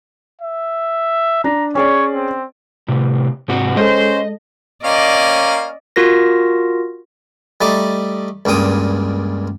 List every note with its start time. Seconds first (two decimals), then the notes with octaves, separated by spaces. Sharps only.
0.41 E5
1.44 D4 A#5
1.75 C#4 G#4 C#5 D5
2.14 C4
2.88 A2 C3
3.48 G#2 C3 F#4
3.77 G#3 C#4 A4 C5 D#5
4.84 A#3 C#4 D5 D#5 F5
5.96 F4 F#4 A#4 A#6
7.61 G3 A3 D#4 D5
8.45 C#2 G2 A#2 G5 D#6